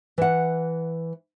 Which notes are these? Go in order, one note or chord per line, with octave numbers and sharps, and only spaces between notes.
E3 F#5